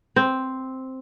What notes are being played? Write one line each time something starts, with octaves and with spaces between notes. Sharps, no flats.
C4